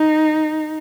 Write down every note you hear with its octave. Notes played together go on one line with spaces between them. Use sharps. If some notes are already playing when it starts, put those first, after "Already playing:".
Already playing: D#4